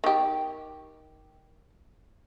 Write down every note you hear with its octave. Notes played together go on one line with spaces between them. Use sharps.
D#3 G4